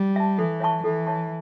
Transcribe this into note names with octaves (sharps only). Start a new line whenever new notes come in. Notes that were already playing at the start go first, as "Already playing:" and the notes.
Already playing: G3
E5 A5
E3 A4
C#5 E5 A5 C#6
E3 A4
C#5 E5 A5 C#6